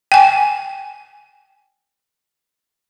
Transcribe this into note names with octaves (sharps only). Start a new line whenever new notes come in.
G5 G#5